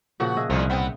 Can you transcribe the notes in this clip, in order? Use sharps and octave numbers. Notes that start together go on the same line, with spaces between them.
A#2 C#3 F3 F#4
G#4 D#5 E5
C2 A#2 F3 F4
B3 C4